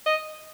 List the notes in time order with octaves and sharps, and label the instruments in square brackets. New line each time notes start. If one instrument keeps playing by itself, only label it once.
[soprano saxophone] D#5